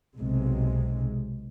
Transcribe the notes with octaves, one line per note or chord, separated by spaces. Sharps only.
B1 C3 G#3